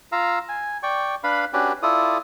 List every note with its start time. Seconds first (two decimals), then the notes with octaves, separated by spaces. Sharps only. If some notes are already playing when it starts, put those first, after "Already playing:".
0.12 F4 F5 A#5 E6
0.49 G#5
0.83 D5 G5 C#6
1.24 D4 B4 F5 B5
1.53 C#4 D4 F#4 G4 B4
1.83 E4 F4 A4 D5 D#6